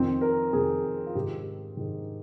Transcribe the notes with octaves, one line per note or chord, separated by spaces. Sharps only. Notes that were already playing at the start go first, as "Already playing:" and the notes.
Already playing: F2 D#3 C4
A#4
F2 D#3 G#4
F4
G#2 D#3 G4
G#2 D#3